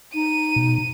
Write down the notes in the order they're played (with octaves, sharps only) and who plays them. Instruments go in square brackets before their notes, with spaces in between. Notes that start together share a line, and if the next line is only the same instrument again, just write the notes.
[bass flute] D#4 [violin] D#7
[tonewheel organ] B2